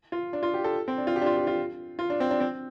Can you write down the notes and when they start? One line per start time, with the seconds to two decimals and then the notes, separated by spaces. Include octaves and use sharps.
0.12 F4
0.33 D4
0.43 F4
0.54 G4
0.64 A4
0.88 C4
0.98 D4
1.07 F4
1.16 G4
1.21 D4
1.26 F4
1.37 G4
1.47 F4
1.99 F4
2.10 D4
2.20 C4
2.31 D4
2.40 C4